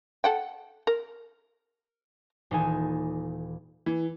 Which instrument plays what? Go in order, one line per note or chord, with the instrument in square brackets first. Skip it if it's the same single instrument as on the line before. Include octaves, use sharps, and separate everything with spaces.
[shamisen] A4 F#5 G5
A#4
[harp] D#1 E3 D#4 A4 G#5
[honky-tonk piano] E3